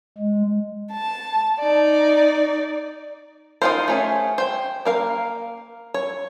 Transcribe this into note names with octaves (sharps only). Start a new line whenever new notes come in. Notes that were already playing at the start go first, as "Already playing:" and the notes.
G#3
A5
D#4 D5
D#4 F4 F#4 A#4 C5
A3 C#4 G#4
C5 G5
A#3 A#4 F5
C#5